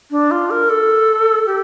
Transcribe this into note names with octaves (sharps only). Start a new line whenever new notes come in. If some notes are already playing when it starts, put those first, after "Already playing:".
D4
F4
A#4
A4
G4